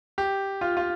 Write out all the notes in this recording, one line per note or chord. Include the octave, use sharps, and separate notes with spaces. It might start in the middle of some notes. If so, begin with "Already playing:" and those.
G4
F4
F4